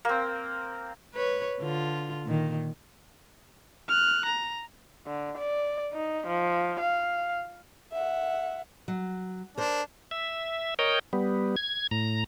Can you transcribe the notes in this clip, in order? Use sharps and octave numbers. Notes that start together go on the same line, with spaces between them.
A#3 C4
B4 C#5
D3 F4
A#2 D#3
F6 F#6
A#5
D3
D5
D#4
F3
F5
E5 F#5
F#3
D4 A#4 C5
E5
A#4 C#5 D#5 G5
G3 B3
G#6
A2 A#5